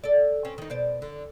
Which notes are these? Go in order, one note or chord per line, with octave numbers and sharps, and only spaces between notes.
A4 D5
C4 C#4
D#3 D#4
B2 C5 D5
D3